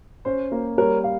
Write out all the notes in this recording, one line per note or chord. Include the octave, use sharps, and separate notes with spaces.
C#4 C5
A#3
G3 A#4 C#5
F5